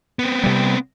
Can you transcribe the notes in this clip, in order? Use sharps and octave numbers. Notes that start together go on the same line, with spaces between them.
B3 C4
C3 G3